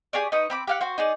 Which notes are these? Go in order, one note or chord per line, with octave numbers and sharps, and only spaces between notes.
G4 G#4 C#5 D5
D#4 B4 C#6 D#6
C4 B5 D6
G4 F5 F#5
F#4 C5
D#4 G#4 D5